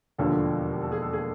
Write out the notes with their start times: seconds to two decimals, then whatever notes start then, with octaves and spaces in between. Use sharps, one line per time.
0.18 E1 D#2 D3 F3 A4
0.82 A4
0.92 G#4
1.02 A4
1.13 G#4